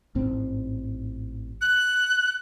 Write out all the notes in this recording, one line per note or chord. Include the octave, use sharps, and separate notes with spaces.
A1 G#2 C4
F#6